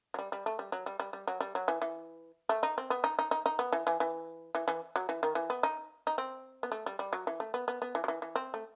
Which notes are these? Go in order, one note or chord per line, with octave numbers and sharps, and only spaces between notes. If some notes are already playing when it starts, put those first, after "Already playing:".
F#3
G3
G3
A3
G3
F#3
G3
G3
G3
F#3
G3
F#3
E3
E3
A3
D#4
C4
B3
D#4
D#4
D#4
D#4
B3
E3
E3
E3
E3
E3
F#3
E3
D#3
E3
B3
D#4
D#4
C4
B3
A3
G3
G3
F#3
E3
A3
B3
B3
B3
E3
F#3
E3
E3
C4
A3